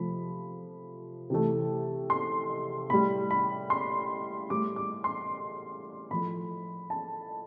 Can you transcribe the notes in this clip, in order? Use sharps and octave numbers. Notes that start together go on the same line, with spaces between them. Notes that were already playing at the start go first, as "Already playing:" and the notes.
Already playing: C3 F3 A3 B5
C3 E3 A3
C6
A2 G3 B5
B5
C6
A2 G3 D6
D6
C6
A2 F3 A3 B5
A5